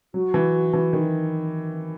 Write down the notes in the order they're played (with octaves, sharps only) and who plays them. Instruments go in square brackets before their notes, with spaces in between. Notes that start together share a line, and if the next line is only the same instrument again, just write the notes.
[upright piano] F#3 [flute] F#4
[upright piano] E3
E3
D#3